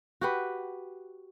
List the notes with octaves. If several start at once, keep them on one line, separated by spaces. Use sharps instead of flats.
F#4 G4 B4